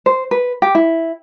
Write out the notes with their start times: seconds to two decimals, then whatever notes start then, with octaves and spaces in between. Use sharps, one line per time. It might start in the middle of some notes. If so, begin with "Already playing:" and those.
0.06 C5
0.31 B4
0.62 G4
0.75 E4